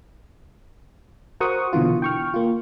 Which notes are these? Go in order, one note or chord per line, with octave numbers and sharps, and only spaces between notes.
F#4 A#4 C5 F#5 C#6 D#6
B2 D3 E3 F4
G5 C#6 F6
A#3 F4